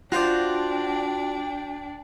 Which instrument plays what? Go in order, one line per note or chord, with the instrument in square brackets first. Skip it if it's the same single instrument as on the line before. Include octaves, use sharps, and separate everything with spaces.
[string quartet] D4 [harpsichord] F4 C5 [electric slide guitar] F#4 D5 [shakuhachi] G5